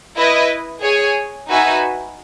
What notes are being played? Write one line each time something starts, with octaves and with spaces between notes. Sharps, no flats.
E4 B4 D#5
G#4 C#5 G#5
D#4 F#4 B4 E5 G#5